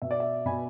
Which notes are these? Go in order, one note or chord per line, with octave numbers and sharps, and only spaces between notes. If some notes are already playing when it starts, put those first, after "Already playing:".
B2 E5
D5
E5
B2 G#5 B5